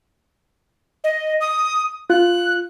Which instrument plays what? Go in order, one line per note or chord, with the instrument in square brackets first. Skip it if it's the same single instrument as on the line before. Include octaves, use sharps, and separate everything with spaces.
[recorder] D#5
D#6
[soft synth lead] F4 [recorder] F#6